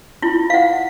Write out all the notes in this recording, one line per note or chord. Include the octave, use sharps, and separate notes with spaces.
E4 F4
F5 F#5